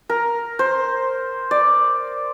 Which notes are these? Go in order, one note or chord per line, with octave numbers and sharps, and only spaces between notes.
A#4
C5
D5